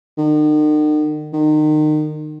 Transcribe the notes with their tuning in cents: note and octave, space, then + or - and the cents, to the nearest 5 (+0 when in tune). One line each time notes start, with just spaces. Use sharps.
D#3 -45
D#3 -30